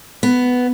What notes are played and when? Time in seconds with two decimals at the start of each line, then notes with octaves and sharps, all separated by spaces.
0.23 B3